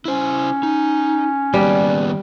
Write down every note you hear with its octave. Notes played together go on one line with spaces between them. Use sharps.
C#4 E4 C5
D#4
D#3 G3 A#3 B3